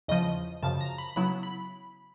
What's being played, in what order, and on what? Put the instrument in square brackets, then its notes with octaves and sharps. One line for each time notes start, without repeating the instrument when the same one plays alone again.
[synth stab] E2 C#3 F3 D#5
F#2 C#3 F3 A5
A#5
B5
C#3 F#3 B3 E4 B5
B5